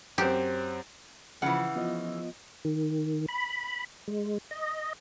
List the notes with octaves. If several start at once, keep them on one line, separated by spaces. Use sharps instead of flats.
F#2 C4 G4
C#3 E3 F3 F#5
F3 B3 F4 D#5
D#3
B5
G#3
D#5